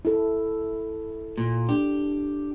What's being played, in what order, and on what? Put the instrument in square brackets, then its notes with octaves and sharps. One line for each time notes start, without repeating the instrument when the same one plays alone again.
[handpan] E4 A4
[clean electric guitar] A#2
[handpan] D4 [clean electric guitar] G4